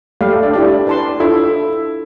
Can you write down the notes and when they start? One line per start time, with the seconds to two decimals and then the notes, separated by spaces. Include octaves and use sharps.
0.21 G3 A4 D5 F5
0.32 A3
0.43 D4
0.53 D4 E4 G4 D5
0.87 B4 D5 A5 C6
1.20 D4 E4 F4 A4